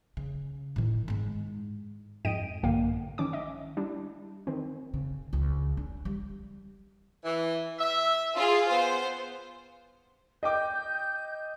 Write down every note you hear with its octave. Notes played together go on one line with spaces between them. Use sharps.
C#3
A2 D#3
G#2 G#3
F2 G#2 D#5 G5 D7 D#7
A#1 G2 D3 A#3 F5 G5
D#3 C#4 D6
D#5 E5
G3 D4 E4
D#3 C4
C#3
C#2
D4
G3
E3
E5
F4 G#4
B3 C5
D#5 G5 D6 G6